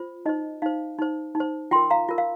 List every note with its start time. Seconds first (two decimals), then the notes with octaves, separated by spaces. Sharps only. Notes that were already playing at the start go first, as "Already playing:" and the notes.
Already playing: F4 C5
0.26 D#4 C5 D#5
0.62 D#4 C5 F5
0.98 D#4 C5
1.35 D#4
1.40 C5
1.71 F4 G5 C6
1.75 A#4
1.90 F5 A#5
2.09 F4 A#4
2.18 F5